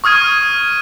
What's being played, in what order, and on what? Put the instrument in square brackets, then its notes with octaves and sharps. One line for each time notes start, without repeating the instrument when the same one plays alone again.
[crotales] C#6 D#6 F6 G#6 D#7